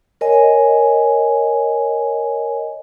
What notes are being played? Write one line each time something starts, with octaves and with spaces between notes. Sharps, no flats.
A#4 C#5 D#5 G#5